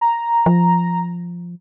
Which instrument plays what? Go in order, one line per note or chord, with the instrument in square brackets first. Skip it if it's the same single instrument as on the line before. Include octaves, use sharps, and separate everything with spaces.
[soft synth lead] A#5
[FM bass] F3